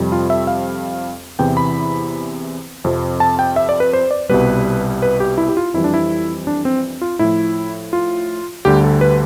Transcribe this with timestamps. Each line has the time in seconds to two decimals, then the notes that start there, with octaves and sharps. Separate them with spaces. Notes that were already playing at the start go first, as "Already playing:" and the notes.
Already playing: F2 C3 G3
0.12 F4
0.30 E5
0.47 F5
1.39 E2 C3 E3 G5
1.57 B5
2.84 F2 C3 F3
3.20 A5
3.39 G5
3.56 E5
3.69 D5
3.80 B4
3.93 C5
4.11 D5
4.29 C2 B2 G3 B4
5.02 B4
5.20 G4
5.38 E4
5.48 G4
5.57 F4
5.74 F2 E3 G3 E4
5.84 D4
5.94 E4
6.47 D4
6.65 C4
7.02 F4
7.19 A2 F3 E4
7.93 F4
8.65 D2 D3 G3 G4
8.84 A4
9.01 B4